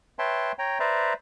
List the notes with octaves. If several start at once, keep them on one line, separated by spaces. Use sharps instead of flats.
B4 C#5 E5 G5 A5 C6
C#5 G5 A#5
B4 C5 D5 E5 A#5